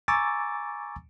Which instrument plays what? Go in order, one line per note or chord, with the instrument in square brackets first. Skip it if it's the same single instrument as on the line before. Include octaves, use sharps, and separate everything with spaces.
[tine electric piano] G#5 A#5 C#6 D6 E6 A6